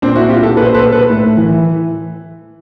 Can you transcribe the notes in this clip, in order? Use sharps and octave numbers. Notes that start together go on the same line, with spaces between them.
A#2 C4 D4
E4 F#4
F4 G4
G4 A4
A#2 A4 B4
C5
A4 B4
A4 B4
A2
E3